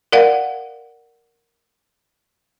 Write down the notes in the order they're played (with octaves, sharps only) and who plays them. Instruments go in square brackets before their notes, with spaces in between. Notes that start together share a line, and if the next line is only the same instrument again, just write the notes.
[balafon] A#4 D5 F5 F#5